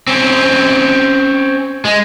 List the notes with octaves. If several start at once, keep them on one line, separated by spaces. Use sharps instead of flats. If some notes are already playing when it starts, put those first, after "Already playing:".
C4 C#4
G#3